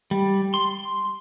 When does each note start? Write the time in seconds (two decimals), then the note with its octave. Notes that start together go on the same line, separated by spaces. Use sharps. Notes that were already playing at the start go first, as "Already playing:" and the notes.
0.11 G3
0.54 C6